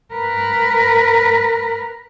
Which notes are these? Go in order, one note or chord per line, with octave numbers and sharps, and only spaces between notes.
A#4 B4